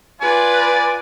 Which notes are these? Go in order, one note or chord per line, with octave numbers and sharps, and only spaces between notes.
F4 B4 D5 G#5